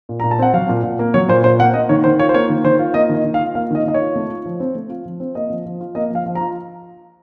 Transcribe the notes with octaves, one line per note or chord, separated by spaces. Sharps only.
A#2
A#2 A#5
A5
C4 F#5
F#3 F5
A#2
A#2
A#3
F#3 C#5
A#2 C5
A#2 C5
A#3 F#5
A#3 D#5
D#3 C#5
D#3 C5
F4 C#5
C5
A#3 C#5
D#3
D#3 C5
F4
A#3 D#5
D#3
D#5
D#3
F5
F4
A#3 F5
D#3 D#5
D#3 D#5
C#5
F4
A3
F4
F3
C4
A3
F4
F3
C4
A#3 D#5
F3
F3
F4
A#3 D#5
F3
F5
F3
A#5
F4